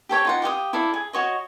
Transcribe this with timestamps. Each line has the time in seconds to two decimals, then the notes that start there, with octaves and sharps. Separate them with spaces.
0.09 G4 A4 C#5 G5
0.25 D#4 F4 F#5
0.42 G4 F5 F#5 D#6
0.73 E4 A4 D5 F5
0.94 G#4
1.13 F#4 C#5 D#5